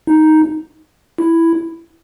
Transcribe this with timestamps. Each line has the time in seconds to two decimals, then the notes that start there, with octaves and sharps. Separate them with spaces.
0.07 D#4
1.18 E4